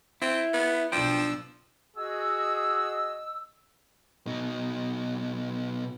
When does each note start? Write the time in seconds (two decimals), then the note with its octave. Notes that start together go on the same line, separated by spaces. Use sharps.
0.22 C4 E4
0.53 B3
0.92 B1 F3 D4 G5 E6
1.97 F#4 G#4 D#5 E6
4.26 B2 D#4